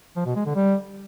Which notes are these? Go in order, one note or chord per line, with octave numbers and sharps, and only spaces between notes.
F3
B2
G#3
D3
G3